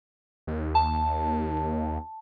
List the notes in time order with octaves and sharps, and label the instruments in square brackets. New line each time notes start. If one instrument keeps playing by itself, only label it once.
[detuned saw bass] D#2
[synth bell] A5